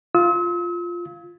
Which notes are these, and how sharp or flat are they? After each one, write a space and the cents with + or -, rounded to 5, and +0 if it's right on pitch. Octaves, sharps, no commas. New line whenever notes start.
F4 +0 E6 -45